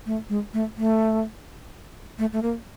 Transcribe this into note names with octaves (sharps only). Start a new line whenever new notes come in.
A3
G#3
A3
A3
A3
A3
A#3